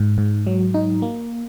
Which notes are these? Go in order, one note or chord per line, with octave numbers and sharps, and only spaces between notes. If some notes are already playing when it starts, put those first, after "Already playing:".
Already playing: G#2
G#2
F#3
D#4
A#3